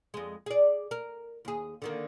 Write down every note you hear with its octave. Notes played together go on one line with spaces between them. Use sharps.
F2 G#3
G#4 D5
A#4
D#2 G#4
D3 D#3 A#3